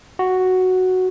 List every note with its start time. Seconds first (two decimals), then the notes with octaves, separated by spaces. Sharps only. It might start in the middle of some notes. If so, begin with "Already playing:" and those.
0.19 F#4